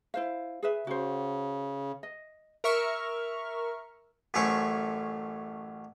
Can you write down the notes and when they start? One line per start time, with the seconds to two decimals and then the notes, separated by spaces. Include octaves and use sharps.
0.14 E4 C5 F5
0.63 G#4 B4 E5
0.87 C#3 F#4 C5
2.03 D#5
2.64 A#4 E5 C#6 F6
4.34 A1 F#2 A3 C#4 C5 C#6